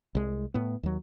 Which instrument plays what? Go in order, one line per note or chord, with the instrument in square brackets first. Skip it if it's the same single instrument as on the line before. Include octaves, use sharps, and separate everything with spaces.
[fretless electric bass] C2 G#3
A2 B3
D#2 F#3